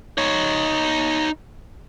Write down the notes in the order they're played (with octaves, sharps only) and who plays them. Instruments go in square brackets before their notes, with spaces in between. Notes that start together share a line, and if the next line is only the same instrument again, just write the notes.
[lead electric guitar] D#4 C#5